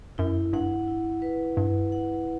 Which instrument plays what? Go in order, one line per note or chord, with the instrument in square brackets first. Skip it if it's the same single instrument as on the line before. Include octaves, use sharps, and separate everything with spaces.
[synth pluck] F#2 [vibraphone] E4
[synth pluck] G2 [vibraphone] F#5
[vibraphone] E4
B4
[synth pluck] G2 [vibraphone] E4
[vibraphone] F#5